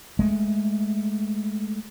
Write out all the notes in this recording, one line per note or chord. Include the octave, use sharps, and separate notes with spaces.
G#3 A3